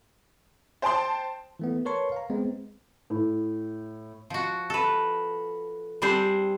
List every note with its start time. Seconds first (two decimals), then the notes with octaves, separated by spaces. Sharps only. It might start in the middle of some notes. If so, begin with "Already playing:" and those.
0.82 C5 G5 A5 C6
1.59 E3 A3 B3
1.85 A#4 B4 C#5 A5 C6 C#6
2.12 F5 A#5
2.30 G#3 B3 C4
3.10 A2
4.30 F3 F#4
4.70 A4 B4
6.02 G3 C4 D4 G#4 C5